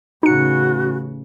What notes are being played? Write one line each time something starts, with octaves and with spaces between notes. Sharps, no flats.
A1 C#3 D#4 F#4 C#7